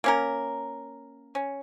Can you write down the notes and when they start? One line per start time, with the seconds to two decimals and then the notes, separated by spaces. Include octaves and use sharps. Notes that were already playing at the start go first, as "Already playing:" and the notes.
0.04 A#3 C#4 A#4
1.35 C#4